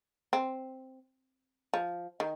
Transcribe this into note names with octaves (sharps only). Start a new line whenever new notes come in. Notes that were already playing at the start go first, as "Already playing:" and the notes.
C4
F3
D#3